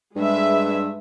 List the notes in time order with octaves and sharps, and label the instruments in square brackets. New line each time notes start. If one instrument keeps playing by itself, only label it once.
[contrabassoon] G2 [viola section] G#3 B4 E5